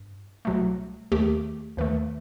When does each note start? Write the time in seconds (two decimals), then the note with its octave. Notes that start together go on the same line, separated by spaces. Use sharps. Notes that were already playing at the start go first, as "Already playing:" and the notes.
Already playing: G2
0.45 C2 B2 F#3 A3
1.12 D#2 D#3 A3 G4
1.77 D#2 D#3 A3 B4